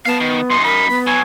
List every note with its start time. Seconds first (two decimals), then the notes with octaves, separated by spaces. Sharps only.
0.06 B3 F5 A5
0.20 D#3
0.50 F#2 D#4 C6
0.64 A#4 B5
0.89 B3
1.07 B2 F#3 G#5